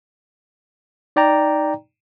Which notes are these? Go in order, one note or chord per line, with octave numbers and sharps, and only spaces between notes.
D#4 D5 G5 A#5